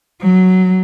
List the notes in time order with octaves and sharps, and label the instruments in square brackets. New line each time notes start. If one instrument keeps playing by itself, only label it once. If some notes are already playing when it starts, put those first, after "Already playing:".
[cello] F#3